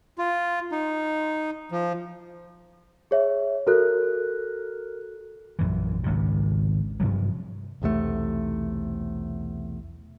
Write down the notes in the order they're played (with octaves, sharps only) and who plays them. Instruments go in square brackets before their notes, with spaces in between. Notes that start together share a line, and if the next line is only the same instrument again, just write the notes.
[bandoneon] F4
D#4
F3
[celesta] G#4 C#5 E5
[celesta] F#4 A4 F#6 [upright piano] A#4
[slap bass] A#1 F#2 E3
G#1 C#2 C3
G2 C3 F3 F#3
[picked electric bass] B1 E2 C3 A3